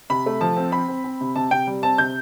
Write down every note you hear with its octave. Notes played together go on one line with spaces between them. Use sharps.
C3 B5
A3
F3 A5
C4
C4 B5
C4
C4
C3
C3 A5
C3 G5
G3
C4 A5
C3 G6